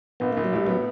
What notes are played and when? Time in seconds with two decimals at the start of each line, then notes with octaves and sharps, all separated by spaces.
0.20 A#1 B3
0.33 A#1 A#3
0.45 F#3
0.53 A2 G3
0.67 F#3 B3